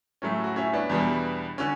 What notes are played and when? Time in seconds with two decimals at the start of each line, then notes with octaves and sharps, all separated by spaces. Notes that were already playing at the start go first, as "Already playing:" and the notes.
0.22 A2 F#3 A3 C#4
0.44 F#4
0.56 C#4 E4
0.73 B3 D4
0.89 E2 B2 G3
1.58 D3 C#4